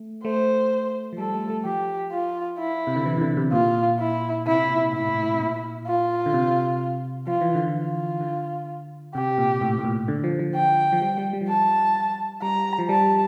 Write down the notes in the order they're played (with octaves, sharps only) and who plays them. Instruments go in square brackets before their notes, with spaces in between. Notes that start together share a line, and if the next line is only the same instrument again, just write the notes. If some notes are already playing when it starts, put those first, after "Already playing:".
Already playing: [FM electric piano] A3
[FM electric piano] A3 [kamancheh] C5
[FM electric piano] F3
[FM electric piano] G3 [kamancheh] A4
[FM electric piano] A3
A3
[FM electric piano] F3 [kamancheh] G4
[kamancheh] F4
E4
[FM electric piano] C3
D3
E3
C3
D3
C3
[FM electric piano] A#2 [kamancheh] F4
[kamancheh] E4
[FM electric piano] C3 [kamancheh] E4
[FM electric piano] A#2
A#2
[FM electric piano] A2 [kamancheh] E4
[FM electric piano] A2
A2
C3
A#2
[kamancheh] F4
[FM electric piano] D3
C3
[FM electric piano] F3 [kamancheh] F4
[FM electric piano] E3
D3
E3
[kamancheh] F4
[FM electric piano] D3
[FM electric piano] C3 [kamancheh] G4
[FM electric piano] A#2
A2
A2
A#2
D3
F3
F3
[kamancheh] G5
[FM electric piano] F3
G3
G3
G3
F3
[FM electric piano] G3 [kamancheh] A5
[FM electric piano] G3 [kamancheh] A#5
[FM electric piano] F3
[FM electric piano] G3 [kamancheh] A5